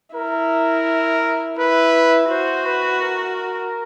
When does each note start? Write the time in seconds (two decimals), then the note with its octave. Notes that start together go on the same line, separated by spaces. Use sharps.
0.15 E4 A#4
1.59 E4 B4
2.30 F#4 C5
2.66 B4
3.02 A#4